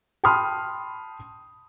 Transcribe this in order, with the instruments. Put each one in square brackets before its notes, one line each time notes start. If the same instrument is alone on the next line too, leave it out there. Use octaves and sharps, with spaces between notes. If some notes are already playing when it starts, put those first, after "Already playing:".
[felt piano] G5 A5 B5 C6 D#6 F6